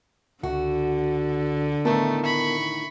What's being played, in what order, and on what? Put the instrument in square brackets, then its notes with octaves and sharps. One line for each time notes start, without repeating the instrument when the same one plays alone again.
[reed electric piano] C#2 [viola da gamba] D3 [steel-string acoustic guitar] F#4
[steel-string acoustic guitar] A2 D#3 [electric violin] A3 [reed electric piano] B3 A#4 A5
[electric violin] B5 C#6